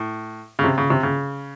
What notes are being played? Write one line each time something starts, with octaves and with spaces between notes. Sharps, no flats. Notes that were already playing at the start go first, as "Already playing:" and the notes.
Already playing: A2
C#3
C3
C#3
C3
C#3